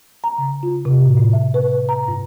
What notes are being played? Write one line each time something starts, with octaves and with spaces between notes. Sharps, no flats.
A#5
C#3
F4
C3
A2
A2
E5
B4
A#5
G2